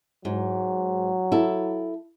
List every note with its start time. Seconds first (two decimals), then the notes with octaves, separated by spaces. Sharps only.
0.25 G#2 F#3
1.32 E4 A4